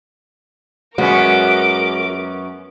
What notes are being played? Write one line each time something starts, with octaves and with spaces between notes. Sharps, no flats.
F#2 G#3 B3 C#4 F#4 A#4 D6